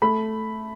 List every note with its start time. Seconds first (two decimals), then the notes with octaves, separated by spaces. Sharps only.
0.02 A3 B5